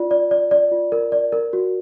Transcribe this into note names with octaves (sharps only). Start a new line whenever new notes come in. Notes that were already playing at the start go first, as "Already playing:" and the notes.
Already playing: F4 D5
D5
D5
D5
F4
A#4
D5
A#4
F#4